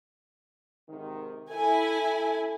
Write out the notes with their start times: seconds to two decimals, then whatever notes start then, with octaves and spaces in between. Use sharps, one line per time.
0.88 G#2 C3 D#3
1.50 E4 A4 G#5